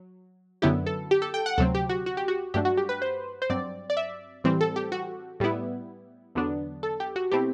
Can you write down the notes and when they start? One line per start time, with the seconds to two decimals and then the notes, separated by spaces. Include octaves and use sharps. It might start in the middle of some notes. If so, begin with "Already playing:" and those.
Already playing: F#3
0.62 F#2 D3 F#3 B3 E4 G4
0.86 A4
1.11 G4
1.22 A4
1.34 G5
1.46 F#5
1.58 D2 C3 F#3 C4 A4
1.75 G4
1.89 F#4
2.06 F#4
2.17 G4
2.28 F#4
2.54 G2 F#3 A3 D4 G4
2.65 F#4
2.77 G4
2.89 B4
3.02 C5
3.42 C5
3.50 G2 F#3 C4 D5
3.90 D5
3.97 E5
4.44 A2 E3 G3 C4
4.61 A4
4.76 G4
4.92 F#4
5.40 A2 G3 B3 E4
6.35 E2 D3 F#3 B3 D4
6.83 A4
7.00 G4
7.16 F#4
7.31 B2 A3 C4 E4 G4